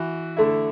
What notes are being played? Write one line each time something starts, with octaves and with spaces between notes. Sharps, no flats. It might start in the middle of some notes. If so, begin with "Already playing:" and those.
Already playing: E3 F#4
D3 A3 E4